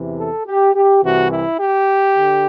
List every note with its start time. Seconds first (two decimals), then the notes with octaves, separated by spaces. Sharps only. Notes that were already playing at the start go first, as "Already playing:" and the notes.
Already playing: E2 C3 E3
0.18 A4
0.46 G4
0.75 G4
1.03 C2 C3 E3 F#4
1.32 E4
1.60 G4
2.17 D3